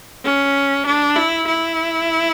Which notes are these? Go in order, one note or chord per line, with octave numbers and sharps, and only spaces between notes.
C#4
D4
E4
E4